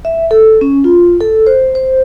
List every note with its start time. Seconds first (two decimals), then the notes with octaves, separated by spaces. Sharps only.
0.05 E5
0.31 A4
0.61 C#4
0.84 F4
1.21 A4
1.47 C5
1.75 C5